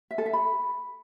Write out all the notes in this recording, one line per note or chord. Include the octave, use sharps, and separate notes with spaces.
E5
A4
E5
B5